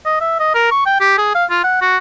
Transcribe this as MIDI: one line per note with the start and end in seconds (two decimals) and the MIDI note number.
0.06 0.16 75
0.21 0.40 76
0.40 0.54 75
0.54 0.70 70
0.71 0.84 85
0.86 0.99 79
1.00 1.17 67
1.18 1.35 68
1.35 1.45 77
1.50 1.59 65
1.64 1.81 78
1.82 1.97 66